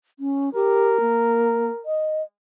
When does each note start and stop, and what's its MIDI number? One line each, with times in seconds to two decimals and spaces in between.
0.19 0.50 61
0.55 0.97 67
0.55 1.84 70
1.01 1.70 58
1.86 2.23 75